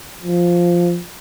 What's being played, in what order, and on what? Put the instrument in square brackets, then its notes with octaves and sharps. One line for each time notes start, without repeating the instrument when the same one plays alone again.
[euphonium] F3